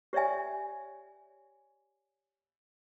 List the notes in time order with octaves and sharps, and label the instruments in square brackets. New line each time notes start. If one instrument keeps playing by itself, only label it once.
[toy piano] G4 C#5 D5 E5 G#5